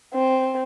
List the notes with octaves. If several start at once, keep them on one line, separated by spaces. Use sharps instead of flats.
C4